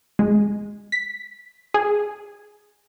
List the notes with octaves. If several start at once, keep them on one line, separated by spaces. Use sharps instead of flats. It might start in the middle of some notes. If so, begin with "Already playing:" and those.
G#3
B6
G#4